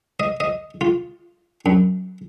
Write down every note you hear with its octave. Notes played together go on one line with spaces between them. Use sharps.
D#5
D#5
F4
F#2